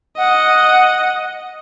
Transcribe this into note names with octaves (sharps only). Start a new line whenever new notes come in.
D#5 F#5